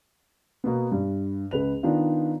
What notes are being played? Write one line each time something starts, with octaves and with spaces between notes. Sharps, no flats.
B2 A#3 B3
G2
C#2 B4 F7
D#3 B3 D4 D#4 F4